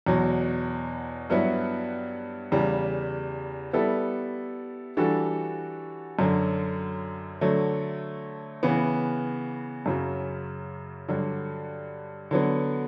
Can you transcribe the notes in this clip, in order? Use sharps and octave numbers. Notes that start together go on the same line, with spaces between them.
E2 B2 F#3
G2 F#3 B3 E4
E2 C#3 G3
G3 B3 E4 A4
E3 G3 D4 F#4 A4
F#2 D3 F#3
D3 F#3 A3
C#3 E3 B3
F#2 C#3 F#3
G2 D3 F#3
D3 F#3 B3